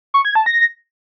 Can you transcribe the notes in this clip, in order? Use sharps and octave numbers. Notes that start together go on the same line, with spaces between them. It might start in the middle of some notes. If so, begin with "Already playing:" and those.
C#6
G#6
A5
A#6